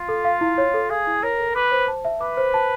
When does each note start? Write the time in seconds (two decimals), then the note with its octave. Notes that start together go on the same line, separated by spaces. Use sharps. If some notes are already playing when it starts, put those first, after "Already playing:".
Already playing: F4
0.09 A4
0.25 F5
0.41 E4
0.58 C#5
0.74 A4
0.90 G#4 F5
1.07 E4
1.23 A#4 C#5
1.39 A4
1.55 B4 D6
1.72 C5
1.88 A5
2.05 E5
2.21 B4 D6
2.37 C5
2.54 A5